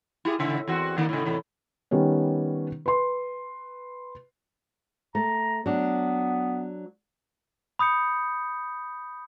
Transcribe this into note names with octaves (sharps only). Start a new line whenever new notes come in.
E4 G4 G#4
A2 C#3 E5
E2 C4 F#4
D3 D#3 A#3
A2 C#3
E2 A2 C3
D#3 G3 B3 C#4
B4 C6
A3 A#5
F#3 B3 D4
B5 D#6 G6 C#7